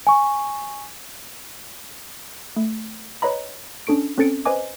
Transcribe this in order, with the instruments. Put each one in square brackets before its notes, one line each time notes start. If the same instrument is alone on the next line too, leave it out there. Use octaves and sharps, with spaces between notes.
[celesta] G#5 C#6
[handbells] A3
B4 C#5 D#5 A#5 B5
C#4 D4 A4 C#6 D7
C4 C#4 A4 A6 C#7 D7
B4 C5 D#5 G#5 D6